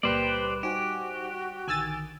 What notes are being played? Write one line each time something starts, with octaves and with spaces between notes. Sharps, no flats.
C#2 A#2 G3 A#3 G4 B4 C5 D5
D#4 F#4 G4 C5 G#5
A#1 D3 D#3 G#5 E6 A6